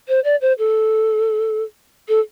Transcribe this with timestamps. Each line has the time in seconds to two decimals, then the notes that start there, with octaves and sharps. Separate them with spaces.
0.08 C5
0.24 D5
0.41 C5
0.58 A4
2.08 A4